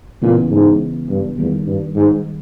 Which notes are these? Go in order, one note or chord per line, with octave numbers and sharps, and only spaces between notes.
A#2 C#3 E3 G#3 B3 E4
G#2
G2
E2 D#3 G3 A#3
G2
G#2